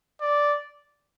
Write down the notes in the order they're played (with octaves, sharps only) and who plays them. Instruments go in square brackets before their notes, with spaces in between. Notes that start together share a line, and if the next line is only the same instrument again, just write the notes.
[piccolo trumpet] D5